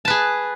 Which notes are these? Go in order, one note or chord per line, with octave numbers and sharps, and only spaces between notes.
G#4 B4 A5